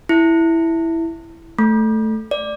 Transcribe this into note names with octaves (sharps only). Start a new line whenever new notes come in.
E4
A3
D5